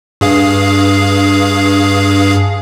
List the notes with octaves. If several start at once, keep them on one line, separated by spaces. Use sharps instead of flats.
G2 G#4 F5